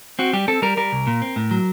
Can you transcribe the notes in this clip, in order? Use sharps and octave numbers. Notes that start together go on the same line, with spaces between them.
C4 F#4
G3 G4
C4 A4
G3 A#4
G3 A#4
C2
A#2
C4
A2
F#3